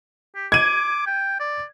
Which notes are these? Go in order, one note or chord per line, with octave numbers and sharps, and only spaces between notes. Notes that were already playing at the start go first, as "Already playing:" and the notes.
G4
D6 G#6 D#7
G5
D5